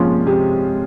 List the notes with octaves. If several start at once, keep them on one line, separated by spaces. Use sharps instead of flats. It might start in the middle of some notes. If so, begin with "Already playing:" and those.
Already playing: C3 F3 G#3 A#3 C#4 F4
C3 G#3